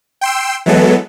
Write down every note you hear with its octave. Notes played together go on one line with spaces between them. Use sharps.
G5 C6 E6
E3 F#3 G#3 B3 A4